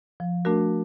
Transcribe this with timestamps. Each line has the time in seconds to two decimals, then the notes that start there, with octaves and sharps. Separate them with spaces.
0.20 F3
0.45 A3 D4 F#4 A#4